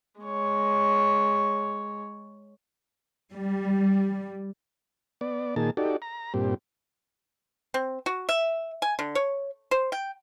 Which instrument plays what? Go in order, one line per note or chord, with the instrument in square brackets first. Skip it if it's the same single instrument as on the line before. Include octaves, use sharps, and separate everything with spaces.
[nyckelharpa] G#3 C#5
[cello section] G3
[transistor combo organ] B3 D5
A#2 D#3 A#3 G#4 A5
D#4 F#4 G4 A4 D5
A#5
G2 A#2 C4 G4
[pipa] C4
F#4
E5
G#5
D3
C#5
C5
G5